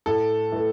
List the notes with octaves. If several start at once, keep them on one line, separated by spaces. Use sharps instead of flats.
A2 A4
E3 A3